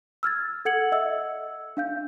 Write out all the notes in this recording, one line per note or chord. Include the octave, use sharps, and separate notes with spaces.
E6 F6 G#6 A6
A4 F#5 G#6 C#7 F#7
D#5 E5 E6
D4 F5 G6